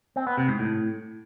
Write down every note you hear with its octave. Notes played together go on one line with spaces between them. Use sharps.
C4
B3
C3
G#2
A2